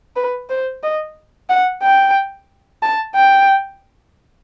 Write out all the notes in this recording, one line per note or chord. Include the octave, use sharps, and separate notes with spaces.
B4
C5
D#5
F#5
G5
A5
G5